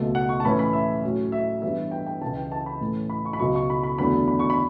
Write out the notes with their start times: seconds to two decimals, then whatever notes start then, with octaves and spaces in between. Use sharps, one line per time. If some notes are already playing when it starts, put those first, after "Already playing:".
Already playing: C#2 B2 A3
0.15 F#5
0.29 C#6
0.40 A5
0.44 A2 E3 A3 C#4 B5
0.59 B5
0.73 E5
1.03 A2 F#3 C#4
1.32 E5
1.62 G2 E3 B3 E5
1.91 G5
2.06 G5
2.21 C#2 C#3 E3 A5
2.37 G5
2.52 A5
2.66 B5
2.81 A2 E3 A3 C#4
3.10 B5
3.25 C#6
3.33 B5
3.39 C#2 B2 F#3 C#6
3.55 C#6
3.70 B5
3.83 B5
3.98 E2 D3 F#3 A3 B5
4.28 B5
4.39 C#6
4.50 B5